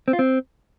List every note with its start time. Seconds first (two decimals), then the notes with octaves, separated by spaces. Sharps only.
0.08 C4
0.13 F4
0.19 C4